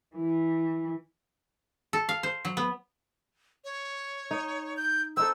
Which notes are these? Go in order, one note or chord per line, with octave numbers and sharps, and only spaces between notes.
E3
A4
F5
C5
F#3
B3
C#5
D#4
G6
C4 D#4 A4 E6